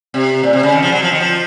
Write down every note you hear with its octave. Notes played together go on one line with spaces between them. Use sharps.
C3
A#2
C3
C#3
D#3
F3
F#3
F3
D#3
F3